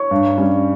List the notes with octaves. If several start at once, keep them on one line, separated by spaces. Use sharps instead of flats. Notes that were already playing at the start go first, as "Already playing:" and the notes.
Already playing: C#5 C#6
G2
G3 C#4